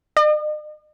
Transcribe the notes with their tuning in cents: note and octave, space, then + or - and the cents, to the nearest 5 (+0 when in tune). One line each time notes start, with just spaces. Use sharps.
D#5 -45